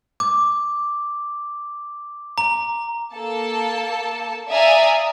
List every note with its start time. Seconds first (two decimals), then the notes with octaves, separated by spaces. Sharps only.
0.20 D6
2.38 A#5
3.13 A#3 A4 A5
4.49 D5 E5 F5 G#5 A#5 D#6